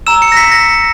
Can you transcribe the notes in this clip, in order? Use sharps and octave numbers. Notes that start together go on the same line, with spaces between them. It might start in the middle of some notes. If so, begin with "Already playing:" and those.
A#5 E6 E7
C#7
A#6
B6
A#6